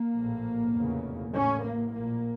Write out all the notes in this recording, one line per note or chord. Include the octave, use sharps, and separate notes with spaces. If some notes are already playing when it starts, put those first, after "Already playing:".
Already playing: A#3
A#1 A2
F1 E2 C#3
A1 A2 C#4
A#3
A#1 A#2 A#3